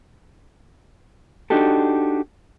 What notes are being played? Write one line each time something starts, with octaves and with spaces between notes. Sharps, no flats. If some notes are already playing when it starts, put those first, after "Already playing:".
D4 D#4 F#4 G4 A4